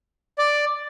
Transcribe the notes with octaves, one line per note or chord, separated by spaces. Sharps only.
D5